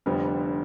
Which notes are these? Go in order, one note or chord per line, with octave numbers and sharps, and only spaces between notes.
F1 F2 D3 G3 B3